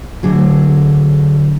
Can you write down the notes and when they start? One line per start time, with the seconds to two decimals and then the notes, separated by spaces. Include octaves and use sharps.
0.23 D2 D3 F#3 G#4